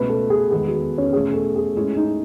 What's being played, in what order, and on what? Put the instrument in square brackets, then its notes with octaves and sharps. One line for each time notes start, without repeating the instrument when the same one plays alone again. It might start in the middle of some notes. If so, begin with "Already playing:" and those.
Already playing: [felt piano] C#2 B2 A3 [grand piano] B4
[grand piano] A4
G#4
[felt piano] E2 D#3 G#3 B3 [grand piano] G#4
[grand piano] F#4
C#4
[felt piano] E2 B2 A3 C#4 [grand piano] G#4
[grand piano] A4
G#4
[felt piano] A2 G#3 C#4 E4 G#4
[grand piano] D#4